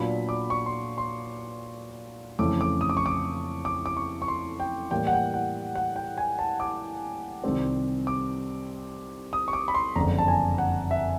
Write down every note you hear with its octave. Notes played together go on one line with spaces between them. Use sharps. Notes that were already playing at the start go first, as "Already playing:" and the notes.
Already playing: A#2 F#3 B3 D4 F4 B5
D6
C#6
C6
C6
F2 C#3 E3 A3 C#4 D6
D6
D#6
D6
C#6
D6
D6
D6
C#6
C#6
C6
G5
A2 E3 G3 A#3 G5
F#5
G5
F#5
F#5
G5
G#5
A5
D6
C2 C3 D#3 G3 C4
D6
D#6
C#6
D6
B5
C6
F#1 F2 D3 A#5
A5
G#5
F#5
E5